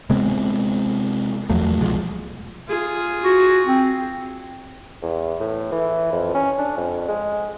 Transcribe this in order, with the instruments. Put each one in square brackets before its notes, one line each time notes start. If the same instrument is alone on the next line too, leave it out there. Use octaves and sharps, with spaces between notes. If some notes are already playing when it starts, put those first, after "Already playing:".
[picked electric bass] C3 G#3 B3 C4
E2 F3 F#3 A3
C2 B2 F3 G#3
[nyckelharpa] F4 G#4
[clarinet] F#4
C4
[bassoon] E2
A2
E3
F2
C#4
D4
F2
G#3